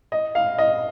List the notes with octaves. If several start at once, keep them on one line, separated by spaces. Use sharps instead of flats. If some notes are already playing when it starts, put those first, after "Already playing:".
D#5
F5
D#5